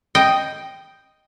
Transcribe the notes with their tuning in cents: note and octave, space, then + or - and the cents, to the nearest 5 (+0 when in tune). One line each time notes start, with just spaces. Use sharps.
D#5 +0 G5 +0